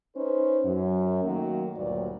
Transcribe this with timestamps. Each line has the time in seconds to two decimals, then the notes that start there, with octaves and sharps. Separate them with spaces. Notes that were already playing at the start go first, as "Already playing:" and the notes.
0.16 C#4 D#4 B4 C5
0.64 F#2
1.24 D#3 F#3 A3 A#3
1.75 D2 G2 A#2 F#3 G3 D5